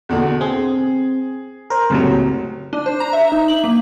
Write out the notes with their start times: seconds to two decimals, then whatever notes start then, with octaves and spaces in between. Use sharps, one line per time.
0.09 E2 B2 D3
0.41 C4 G#4
1.70 A#4 C5
1.90 F#1 C#2 A2 C3 F#3
2.73 D4
2.86 C5
3.00 A#5
3.13 E5
3.32 D#4
3.48 F#7
3.64 A#3